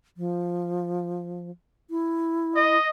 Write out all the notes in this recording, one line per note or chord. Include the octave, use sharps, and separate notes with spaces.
F3
E4
D#5